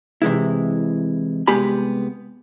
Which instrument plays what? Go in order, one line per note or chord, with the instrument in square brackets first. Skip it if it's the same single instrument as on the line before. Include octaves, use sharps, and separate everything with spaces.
[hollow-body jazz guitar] C3 E3 G#3 E4
C2 G#3 B3 G4 G#5 B5